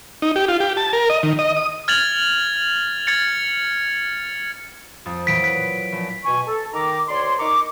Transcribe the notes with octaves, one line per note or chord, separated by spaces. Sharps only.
D#4
G4
F4
G4
A5
A#4
D#5
D#3
D#5
D#6
F6 G#6 A6 F7 F#7
G#6 A6 C#7
F2 D#6 A6
A#2 E3 F#3 B6 D7
B4 B6
A#1
B2 G#5 C#6
A4
D#3 A#5 D6
D2 C#5 D5 C6
D#4 A#4 A#5 C#6 D6